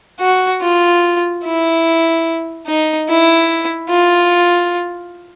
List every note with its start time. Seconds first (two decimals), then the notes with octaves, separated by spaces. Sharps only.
0.20 F#4
0.61 F4
1.44 E4
2.67 D#4
3.09 E4
3.90 F4